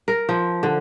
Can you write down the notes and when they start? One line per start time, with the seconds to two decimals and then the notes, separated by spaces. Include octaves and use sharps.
0.08 A#4
0.29 F3
0.63 D3